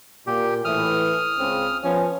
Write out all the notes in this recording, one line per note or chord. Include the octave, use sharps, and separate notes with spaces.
A#2 G4
A2 E3 D#6 F6
C#2 C#3 C4
F3 B3 C#4